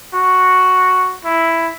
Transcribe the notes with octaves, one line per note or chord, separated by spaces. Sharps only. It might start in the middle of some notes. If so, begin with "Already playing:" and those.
F#4
E4